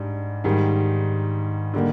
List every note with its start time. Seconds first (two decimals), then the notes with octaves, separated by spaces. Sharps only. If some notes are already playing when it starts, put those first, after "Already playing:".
Already playing: G#2 G3 D4
0.44 G#2 D#3 G3
1.74 D3 G3 A#3 D#4 G4